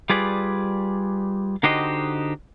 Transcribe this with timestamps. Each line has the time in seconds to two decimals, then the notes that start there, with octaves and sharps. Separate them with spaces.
0.10 G3 F4 G#4 B4 D5
1.63 D3 D#4 F#4 G4 C5 D#5